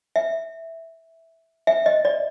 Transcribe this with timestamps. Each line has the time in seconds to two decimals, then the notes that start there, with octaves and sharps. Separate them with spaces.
0.16 E5
1.67 E5
1.86 D#5
2.05 D5